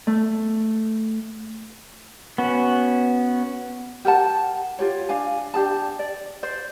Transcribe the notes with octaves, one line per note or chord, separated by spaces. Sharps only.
A3
B3 C#4 F#4
G4 A#4 F#5 A5
F4 G4 C#5
D4 F5 G#5
D4 G4 G#4 A5
D5
C5 D5